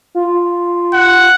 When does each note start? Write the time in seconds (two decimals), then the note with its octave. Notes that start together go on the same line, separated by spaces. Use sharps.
0.15 F4
0.93 F#5